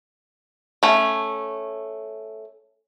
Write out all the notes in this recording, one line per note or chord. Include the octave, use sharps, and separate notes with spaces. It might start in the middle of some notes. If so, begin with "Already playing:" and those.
A3 C#4